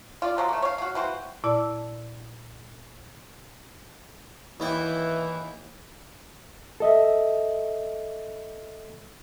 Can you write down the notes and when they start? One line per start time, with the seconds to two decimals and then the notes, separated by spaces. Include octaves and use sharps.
0.22 F4 D5
0.37 F3 F#3 G#3
0.49 A3 A#3
0.62 C#5 F5
0.78 F#4 F5
0.95 E3 C4 F#4 C5
1.44 A#2 E4 D5 A5 E6
4.60 D#2 E3 E4 G5
6.80 A4 D#5 E5